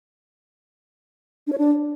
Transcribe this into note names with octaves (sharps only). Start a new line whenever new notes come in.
D4
C#5
D4